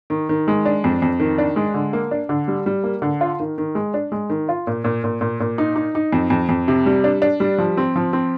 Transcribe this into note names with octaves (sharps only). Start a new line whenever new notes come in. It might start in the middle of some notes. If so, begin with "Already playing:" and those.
D#3
D#3
G#3
D4
F2
F2
D#3
D4
G#3
D3
A#3
D4
D3
G3
G3
A#3
D3
F4
D#3
D#3
G#3
D4
G#3
D#3
F4
A#2
A#2
A#2
A#2
A#2
D#4
D#4
D#4
F2
F2
F2
C3
G3
D4
D4
G3
F3
C4
F3
C4